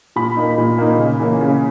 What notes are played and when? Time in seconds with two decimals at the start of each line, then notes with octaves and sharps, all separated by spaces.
0.16 A#2 B5
0.37 A#3 D#4
0.58 A#2
0.78 A#3 D#4
0.98 C#3
1.20 E3 A#3 C#4
1.41 C#3